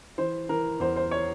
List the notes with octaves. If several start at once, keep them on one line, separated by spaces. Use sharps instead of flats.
E3 C5
E3 A#4
E2 C5
C5
C#5